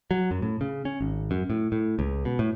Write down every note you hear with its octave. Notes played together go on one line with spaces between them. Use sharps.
F#3
F#2
A2
C#3
C#4
G#1
F#2
A2
A2
C#2
B2
A2